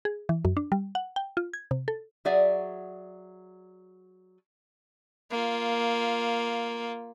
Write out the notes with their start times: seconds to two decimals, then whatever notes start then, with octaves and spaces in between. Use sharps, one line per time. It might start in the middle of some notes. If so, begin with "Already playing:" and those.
0.05 G#4
0.29 E3
0.45 F#2
0.57 D4
0.72 G3
0.95 F#5
1.16 G5
1.37 F4
1.54 G#6
1.71 C3
1.88 A4
2.25 F#3 G#4 D5 E5 F#5
5.31 A#3 F4